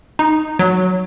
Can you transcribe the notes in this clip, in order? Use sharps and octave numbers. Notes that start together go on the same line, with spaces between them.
D#4
F#3